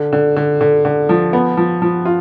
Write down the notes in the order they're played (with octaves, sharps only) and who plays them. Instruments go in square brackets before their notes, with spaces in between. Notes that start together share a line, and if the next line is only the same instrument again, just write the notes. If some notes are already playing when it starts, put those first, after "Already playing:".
Already playing: [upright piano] D3
D3
D3
D3
D3
F3
B3
F3
F3
F4